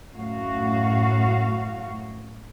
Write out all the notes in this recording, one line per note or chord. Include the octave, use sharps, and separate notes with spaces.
F#2 A2 F#4 F5